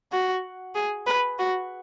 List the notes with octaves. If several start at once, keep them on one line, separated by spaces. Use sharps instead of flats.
F#4
G#4
B4
F#4